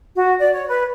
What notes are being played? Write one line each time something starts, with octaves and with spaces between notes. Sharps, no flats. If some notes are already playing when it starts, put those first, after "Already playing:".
F#4
D5
C#5
B4